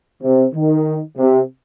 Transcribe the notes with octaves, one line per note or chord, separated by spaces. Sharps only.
C3
D#3
C3